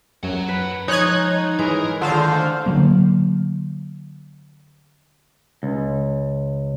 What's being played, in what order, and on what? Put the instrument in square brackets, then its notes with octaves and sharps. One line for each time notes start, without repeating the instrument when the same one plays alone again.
[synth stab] F#2 [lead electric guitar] F#5 A#5
[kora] B4
[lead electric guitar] F3 [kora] G#3 [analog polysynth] D#4 [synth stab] C#5 F#6 G#6
[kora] E3 G#3 [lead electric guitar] A#4 A#5
[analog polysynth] D3 C5 F5 [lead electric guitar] D#3 [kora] G#3 A3 F4
[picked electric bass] D3 F3 F#3 A#3
[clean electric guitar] C#2